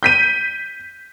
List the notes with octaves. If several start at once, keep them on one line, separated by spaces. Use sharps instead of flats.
G6 B6 D#7